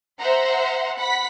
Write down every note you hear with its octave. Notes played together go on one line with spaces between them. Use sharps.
C5 E5 F#5 A#5 C6
F#5 B5 B6